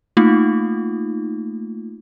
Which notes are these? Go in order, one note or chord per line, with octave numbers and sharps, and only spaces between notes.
A3 A#3 D#4 F4